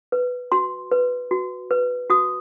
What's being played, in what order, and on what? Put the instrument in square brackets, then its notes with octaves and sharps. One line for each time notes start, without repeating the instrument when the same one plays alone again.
[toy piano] B4
F#4 C6
B4
F#4
B4
F#4 D#6